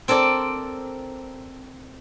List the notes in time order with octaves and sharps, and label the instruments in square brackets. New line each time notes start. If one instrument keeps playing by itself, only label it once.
[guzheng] C4 A4 A#4 D5